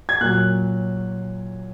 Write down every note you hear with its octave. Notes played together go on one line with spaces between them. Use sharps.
G#6
A#2 F#3 F#6